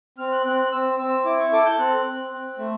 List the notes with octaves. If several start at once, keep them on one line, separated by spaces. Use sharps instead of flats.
C4 F6
F#6
C4 F#6
F#6
C4 E6
C4 E6
E4 D6
C#6
A4 D6
G6
C4 F#6
C4
C4
A3